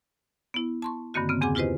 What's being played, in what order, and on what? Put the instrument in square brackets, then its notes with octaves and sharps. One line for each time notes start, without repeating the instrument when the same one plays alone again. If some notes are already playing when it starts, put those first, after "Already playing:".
[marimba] B3 E4
A5 C6 C#6
G2 D3 D#3 A#3 C4 F#4
C#3 B3 C4
E2 C4 G#4 F#5 G#5 D6
E4 F4 G4 B4 C5 D#5